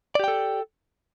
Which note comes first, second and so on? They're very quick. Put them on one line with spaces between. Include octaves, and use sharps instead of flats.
D5 G4 G5 A4